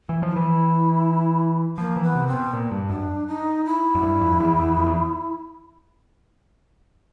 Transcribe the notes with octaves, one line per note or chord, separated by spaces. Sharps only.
E3
F3
E4
E3
F3 A#3
E3
B3
C3
C4
B2
A#2
G2
F#2 D4
D#4
E4
F#2
G2
F2
E2
E2
F2
E2